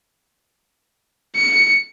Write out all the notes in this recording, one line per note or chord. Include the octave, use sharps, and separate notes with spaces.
C#7